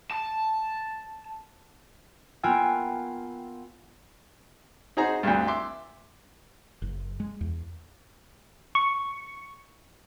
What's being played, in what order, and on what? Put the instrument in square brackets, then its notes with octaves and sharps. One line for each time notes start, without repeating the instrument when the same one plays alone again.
[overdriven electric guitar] A5
[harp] A#3 B3 F4 G5 G#5 E6
[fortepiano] D#4 F#4 G#4 C5 A#5
D2 G2
E5 C6 D6
[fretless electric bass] F#1
G#3
E2
[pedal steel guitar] C#6